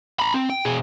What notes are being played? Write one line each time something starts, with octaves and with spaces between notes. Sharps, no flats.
A#5 B5
C4
G5
B2 G#4